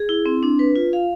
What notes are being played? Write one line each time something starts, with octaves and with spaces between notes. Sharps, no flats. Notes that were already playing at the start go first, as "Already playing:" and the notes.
Already playing: G#4
E4
C4
D4
B4
F4
F5